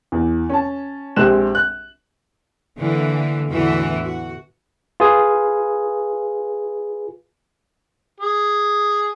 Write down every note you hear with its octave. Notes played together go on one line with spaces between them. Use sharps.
E2
C#4 A5
A#1 G#3 C4 G4 F#6 E7
F#6
D3 E3 A#3
E2 A2 D3 E3 F#4 E5
F#4
F4 G#4 B4 G#5 D#6
G#4